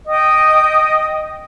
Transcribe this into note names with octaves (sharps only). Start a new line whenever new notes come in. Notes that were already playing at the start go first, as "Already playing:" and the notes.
D#5 G5 D#6